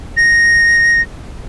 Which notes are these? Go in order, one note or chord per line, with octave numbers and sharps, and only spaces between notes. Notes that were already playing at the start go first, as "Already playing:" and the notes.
A#6